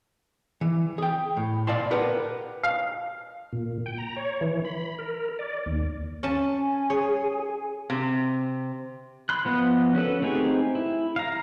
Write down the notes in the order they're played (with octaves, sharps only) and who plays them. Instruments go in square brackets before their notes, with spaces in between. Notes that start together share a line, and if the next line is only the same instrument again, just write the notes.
[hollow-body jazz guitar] E3
G#4 G5
A2
A#2 D5 F5 A5 C6
G4 A#4 B4 F#5
[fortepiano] F5
[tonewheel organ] A#2
G5
A#5
C#5
E3
B5
A#4
D5
D#2
[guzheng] C#4 A5
[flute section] G#5
[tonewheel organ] G#4 [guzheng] C#5
[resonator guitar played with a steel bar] C3
[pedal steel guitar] B5 C6 F#6
F3 B3 D#5 F5 F#6
C#4 F#4 A4 B4
A3 C4 D#4 G4 G#4
E4
F5 A#5